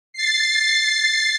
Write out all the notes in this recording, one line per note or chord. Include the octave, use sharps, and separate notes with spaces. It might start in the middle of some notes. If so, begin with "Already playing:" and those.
A6 C7